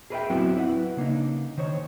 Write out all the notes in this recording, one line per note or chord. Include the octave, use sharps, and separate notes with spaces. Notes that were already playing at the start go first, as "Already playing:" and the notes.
G#4 A#4 B4 C#5 E5 G5
F#3 B3 C4 E4 F#4 B4
E4 B4 F#5
C#3 A#3 D4 D#4
D#3 C5 C#5